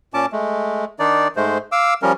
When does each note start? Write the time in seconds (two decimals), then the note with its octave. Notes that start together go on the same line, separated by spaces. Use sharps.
0.14 A#2 C#4 A5 D6
0.32 G#3 A3
0.99 D#3 D4 D#4 D5
1.36 G#2 G#3 A3 C5
1.72 F5 D6 E6
2.02 F3 G3 C#4 A#4